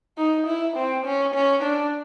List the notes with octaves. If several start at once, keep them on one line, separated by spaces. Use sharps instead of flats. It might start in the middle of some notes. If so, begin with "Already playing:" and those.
D#4
E4
C4
C#4
C#4
D4